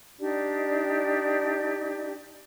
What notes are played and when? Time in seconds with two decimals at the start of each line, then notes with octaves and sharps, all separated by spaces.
0.19 D4 D#4 G4 D5